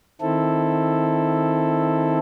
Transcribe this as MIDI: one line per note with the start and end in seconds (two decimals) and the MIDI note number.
0.21 2.19 51
0.21 2.19 60
0.21 2.19 64
0.21 2.19 69